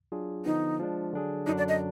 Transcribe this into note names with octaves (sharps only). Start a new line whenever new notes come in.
F#3 D4 F4 G#4
D3 F3 B3 D#4
F3 G#3 D4
D3 F#3 D4 G#4
F#2 D3 F#3 D4 D#4
D5
D#5